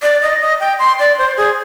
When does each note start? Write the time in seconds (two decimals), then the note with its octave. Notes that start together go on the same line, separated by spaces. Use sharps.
0.02 D5
0.22 D#5
0.41 D#5
0.60 G5
0.79 C6
0.99 D5
1.18 C5
1.37 G#4